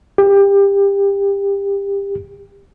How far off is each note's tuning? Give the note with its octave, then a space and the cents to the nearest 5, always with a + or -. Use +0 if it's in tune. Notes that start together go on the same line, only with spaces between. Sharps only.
G4 +25